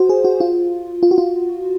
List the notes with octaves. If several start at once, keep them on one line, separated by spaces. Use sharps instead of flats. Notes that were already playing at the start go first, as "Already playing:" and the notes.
Already playing: F#4 C5
G#4
F#4
F4
F4
F#4
F4